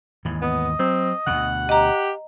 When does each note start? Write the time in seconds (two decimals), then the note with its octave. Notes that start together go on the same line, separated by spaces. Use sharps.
0.25 D#2 G#2 E3
0.42 B3 D#5
0.79 F#3 C4
1.27 D2 B2 F#5
1.69 G4 D#5 A#5